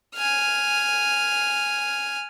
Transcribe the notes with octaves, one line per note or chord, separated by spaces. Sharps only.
G#5 F6